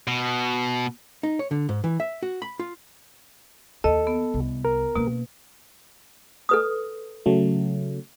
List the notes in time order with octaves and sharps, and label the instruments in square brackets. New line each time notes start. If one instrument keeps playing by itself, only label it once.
[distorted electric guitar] B2
[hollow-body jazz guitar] D#4
C#5
D3
G#2
E3
E5
F#4
B5
F4
[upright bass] D#2 [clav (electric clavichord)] A4 [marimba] D#5
[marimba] B3
[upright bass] C2
[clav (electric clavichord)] A#4
[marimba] B2 [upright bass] A#3 C#4
[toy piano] A4 B4 D#6
[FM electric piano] C#3 F#3 A3